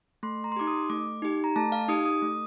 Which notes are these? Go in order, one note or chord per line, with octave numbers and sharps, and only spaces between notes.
A3 C6
A#5
C6
D#4 G4 D6
D#6
A3 D6
D#4 G4
A#5
A3 A5
F5
D#4 G4 D#6
D#6
A3